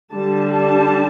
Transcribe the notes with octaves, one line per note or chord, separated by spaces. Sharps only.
D3 G3 D4 A5
A5